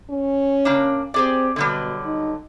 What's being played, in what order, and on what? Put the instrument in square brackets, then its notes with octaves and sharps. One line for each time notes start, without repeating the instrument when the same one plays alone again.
[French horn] C#4
[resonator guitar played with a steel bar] C#3 A#3 D4
[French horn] C4 [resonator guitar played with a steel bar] G4 G#4 D5
[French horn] B2 [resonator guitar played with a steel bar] D3 F#3 G3
[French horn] D#4